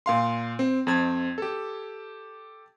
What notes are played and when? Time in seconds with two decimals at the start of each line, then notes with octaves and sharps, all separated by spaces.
0.06 A#2 F5 C6
0.59 C4
0.87 F2 C4 G#6
1.38 G4 A4